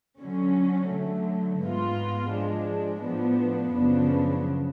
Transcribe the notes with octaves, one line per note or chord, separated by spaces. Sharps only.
D3 F#3 C#4
D3 F#3 A3
G#2 G#3 B3 F4
F3 G#3 D4
A2 F3 B3 D4
F#2 C#3 F3 B3 D4